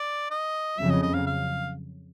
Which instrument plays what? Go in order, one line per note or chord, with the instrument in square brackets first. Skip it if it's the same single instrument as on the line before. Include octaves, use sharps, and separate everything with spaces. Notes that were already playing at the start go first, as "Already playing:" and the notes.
Already playing: [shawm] D5
D#5
[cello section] F2 C#3 F#3 [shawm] E5
[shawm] D#5
D#5
F5
F5